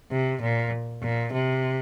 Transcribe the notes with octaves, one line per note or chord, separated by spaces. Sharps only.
C3
A#2
A#2
C3